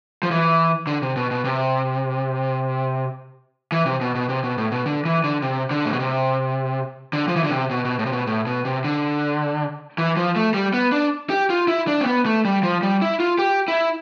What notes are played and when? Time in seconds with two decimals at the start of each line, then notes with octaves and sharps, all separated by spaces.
0.23 F3
0.31 E3
0.87 D3
1.02 C3
1.17 B2
1.31 B2
1.44 C3
3.72 E3
3.86 C3
4.01 B2
4.15 B2
4.29 C3
4.44 B2
4.58 A2
4.72 B2
4.86 D3
5.05 E3
5.24 D3
5.42 C3
5.71 D3
5.86 A2
5.93 B2
5.99 C3
7.13 D3
7.28 F3
7.36 E3
7.44 D3
7.51 C3
7.71 B2
7.85 B2
7.99 A2
8.06 C3
8.12 B2
8.27 A2
8.47 B2
8.65 C3
8.85 D3
9.98 E3
10.17 F3
10.36 A3
10.54 G3
10.74 B3
10.92 D4
11.30 G4
11.50 F4
11.68 E4
11.87 D4
12.01 C4
12.06 B3
12.26 A3
12.45 G3
12.63 F3
12.83 G3
13.02 E4
13.20 F4
13.39 G4
13.68 E4